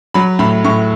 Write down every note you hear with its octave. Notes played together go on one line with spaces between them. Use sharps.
F#3 B5
A2 B5
A2 C#6